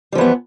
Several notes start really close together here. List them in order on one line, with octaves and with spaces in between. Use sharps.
G3 F3 E3 B3